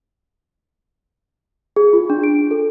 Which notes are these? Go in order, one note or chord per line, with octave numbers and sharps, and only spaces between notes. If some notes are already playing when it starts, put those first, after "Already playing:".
G#4
F4
D4
D7
A4